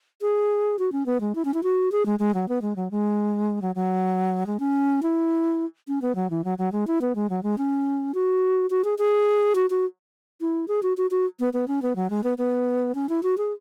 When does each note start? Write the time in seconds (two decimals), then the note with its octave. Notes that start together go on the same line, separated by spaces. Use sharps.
0.21 G#4
0.79 F#4
0.92 C#4
1.06 B3
1.21 G#3
1.35 E4
1.45 C#4
1.54 E4
1.63 F#4
1.92 G#4
2.06 G#3
2.19 G#3
2.34 F#3
2.48 B3
2.62 G#3
2.76 F#3
2.91 G#3
3.62 F#3
3.75 F#3
4.46 G#3
4.60 C#4
5.03 E4
5.88 C#4
6.02 B3
6.15 F#3
6.30 E3
6.44 F#3
6.58 F#3
6.72 G#3
6.87 E4
7.01 B3
7.15 G#3
7.30 F#3
7.43 G#3
7.58 C#4
8.14 F#4
8.70 F#4
8.84 G#4
8.98 G#4
9.55 F#4
9.70 F#4
10.41 E4
10.68 G#4
10.83 F#4
10.97 F#4
11.11 F#4
11.40 B3
11.53 B3
11.68 C#4
11.82 B3
11.96 F#3
12.10 G#3
12.24 B3
12.38 B3
12.95 C#4
13.09 E4
13.23 F#4
13.38 G#4